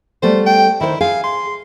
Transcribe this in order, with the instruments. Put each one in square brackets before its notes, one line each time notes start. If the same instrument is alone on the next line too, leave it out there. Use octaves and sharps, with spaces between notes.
[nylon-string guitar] G3 A3 B3 [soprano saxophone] C5
[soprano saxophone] G5
[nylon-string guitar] D#3 C5 [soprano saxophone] E4
[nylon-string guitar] G#4 [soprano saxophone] F5
[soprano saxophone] C6